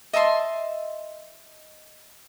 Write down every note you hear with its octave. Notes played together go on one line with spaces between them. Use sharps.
D#5 E5 A5 C6